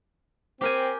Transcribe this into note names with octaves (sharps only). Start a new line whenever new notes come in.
C4 G4 A#4 G#5